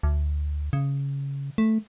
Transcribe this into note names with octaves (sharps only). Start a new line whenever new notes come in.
D2
C#3
A3